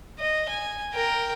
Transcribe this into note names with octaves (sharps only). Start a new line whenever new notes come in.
D#5
G#5
A#4 G5